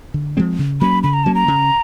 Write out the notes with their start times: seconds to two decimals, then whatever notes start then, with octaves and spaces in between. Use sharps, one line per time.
0.14 D3
0.37 F3 G#3 C4
0.59 C#3
0.81 F#3 A#3 C#4 B5
1.03 C#3 B5
1.13 A#5
1.24 F#3 A#3 C#4 A5
1.35 A#5
1.48 C#3